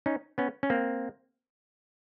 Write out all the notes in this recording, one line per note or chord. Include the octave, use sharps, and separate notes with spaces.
C#4 D#4
B3 C#4
C#4
A#3 C4